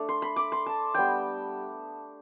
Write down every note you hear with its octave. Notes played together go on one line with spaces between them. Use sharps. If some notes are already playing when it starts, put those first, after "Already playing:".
Already playing: A3 D4
C6
B5
D6
C6
A5
G3 B3 D4 G5